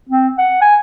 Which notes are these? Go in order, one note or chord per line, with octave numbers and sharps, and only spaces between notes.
C4
F#5
G#5